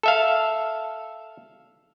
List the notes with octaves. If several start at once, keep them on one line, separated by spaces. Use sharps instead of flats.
A4 E5 F5